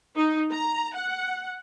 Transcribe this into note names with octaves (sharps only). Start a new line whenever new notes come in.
D#4
A#5
F#5